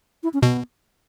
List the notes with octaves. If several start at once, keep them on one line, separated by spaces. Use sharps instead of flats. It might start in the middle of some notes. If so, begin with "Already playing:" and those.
E4
C#4
B2 B3